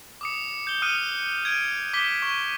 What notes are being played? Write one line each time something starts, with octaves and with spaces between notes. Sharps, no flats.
D6 D#6 C#7
G6 G7
D#6 F6 F#6 C#7 D#7
G#6 D7 D#7
D6 B6 G7
C#6